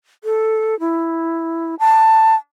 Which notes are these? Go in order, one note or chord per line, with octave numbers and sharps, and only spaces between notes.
A4
E4
A5